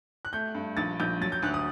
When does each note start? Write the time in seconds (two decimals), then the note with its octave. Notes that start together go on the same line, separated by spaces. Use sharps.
0.25 F#6
0.33 A3 G6
0.54 G2
0.77 A#1 A6
1.00 A#1 G6
1.21 F#3 A6
1.32 G6
1.43 D2 F#6
1.54 D#6